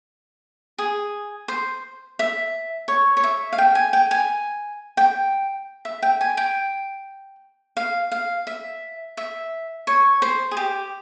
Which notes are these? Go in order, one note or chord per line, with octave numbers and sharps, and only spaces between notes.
G#4
C5
E5
C#5
C#5
E5
F5
G5
G#5
G5
G#5
G5
E5
G5
G#5
G5
F5
F5
E5
E5
C#5
C5
G#4
G4